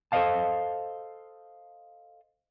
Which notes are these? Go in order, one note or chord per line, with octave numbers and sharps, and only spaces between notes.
A4 C5 D5 D#5 F5 A5